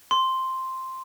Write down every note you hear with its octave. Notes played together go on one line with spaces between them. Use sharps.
C6